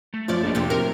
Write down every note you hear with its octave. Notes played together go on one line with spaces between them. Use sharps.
A3
F#2 F3 C#4 D5
A#1 A4 A#4 D#5
F2 A2 C3 F3 D#4 G4
C3 A#4